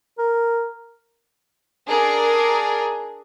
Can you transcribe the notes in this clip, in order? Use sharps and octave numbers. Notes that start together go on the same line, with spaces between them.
A#4
D4 G#4 A#4